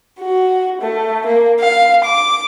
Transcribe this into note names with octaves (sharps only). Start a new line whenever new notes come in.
F#4
A3
A#3
F5
D6